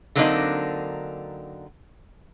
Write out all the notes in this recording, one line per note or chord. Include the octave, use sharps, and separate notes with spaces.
D3 F#3 A#3 C4 D4 D#4